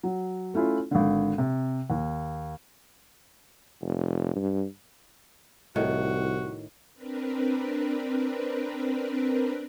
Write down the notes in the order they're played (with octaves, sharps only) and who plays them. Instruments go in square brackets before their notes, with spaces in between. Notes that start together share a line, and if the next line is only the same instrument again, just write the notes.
[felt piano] F#3
A3 C#4 E4 F4
G#1 D3
C3
D#2
[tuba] F1
G2
[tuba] C2 [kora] A2 D#3 [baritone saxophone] F#4
[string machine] C4 D4 A#4 B4